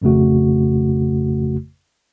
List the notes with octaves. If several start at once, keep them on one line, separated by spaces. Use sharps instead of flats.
G#1 F2 C#3 A3 F#4